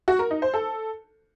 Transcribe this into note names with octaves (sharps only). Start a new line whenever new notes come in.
F#4
A#4
D#4
C5
A4